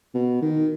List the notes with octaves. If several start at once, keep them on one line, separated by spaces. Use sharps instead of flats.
B2
D#3